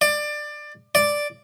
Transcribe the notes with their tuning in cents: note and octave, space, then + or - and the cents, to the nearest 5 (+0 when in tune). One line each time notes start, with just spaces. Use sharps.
D5 +20
D5 +0